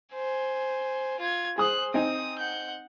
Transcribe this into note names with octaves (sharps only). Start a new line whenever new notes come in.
C5 G#5
F4 G#6
G#4 C5 D#6 F#6
C4 D#4 G#5 D#6
F#5 G6